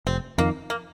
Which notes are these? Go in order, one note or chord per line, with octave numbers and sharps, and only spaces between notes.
F1 C4
F2 D#3 A#3
A#3